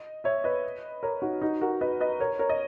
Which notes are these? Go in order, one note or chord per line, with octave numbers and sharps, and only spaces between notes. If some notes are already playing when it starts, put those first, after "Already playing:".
Already playing: D#5
C#5 E5
B4 D#5
A#4 C#5
D#4 F#4
D#4 F#4
F#4 A#4
B4 D#5
B4 D#5
A#4 C#5
A#4 C#5
D#5